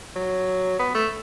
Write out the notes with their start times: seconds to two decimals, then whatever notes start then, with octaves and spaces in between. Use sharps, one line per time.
0.16 F#3
0.79 B3
0.95 A3